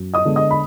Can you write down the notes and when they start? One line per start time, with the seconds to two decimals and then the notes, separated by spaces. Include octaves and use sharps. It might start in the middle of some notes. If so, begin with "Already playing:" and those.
Already playing: F#2
0.14 D#5 D#6
0.25 D3 G#3 B3
0.36 D#5 D#6
0.51 B5